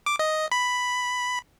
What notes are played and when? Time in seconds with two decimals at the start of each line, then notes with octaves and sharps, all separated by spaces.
0.06 D6
0.19 D#5
0.52 B5